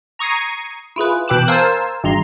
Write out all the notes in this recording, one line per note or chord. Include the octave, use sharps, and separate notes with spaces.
A#5 C#6 D#6 G#6 C7
E4 F4 G#4 B4
B2 E3 G5 D6 F#6 E7
A#4 C5 F5 G#5 A5 E6
G#1 G2 A#5 C6